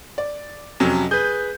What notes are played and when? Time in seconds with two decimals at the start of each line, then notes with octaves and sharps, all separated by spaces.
0.18 D5
0.80 F2 C3 F#3 C#4
1.11 G#4 B4 G6